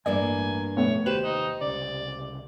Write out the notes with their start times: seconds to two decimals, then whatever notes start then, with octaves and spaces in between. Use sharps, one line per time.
0.06 A1 G2 A#3 D5 E5 G#5
0.77 A1 F2 B2 A3 B3 C#5
1.06 F1 D#2 G4 B4 C5 E7
1.24 D#4
1.61 C2 C#3 D5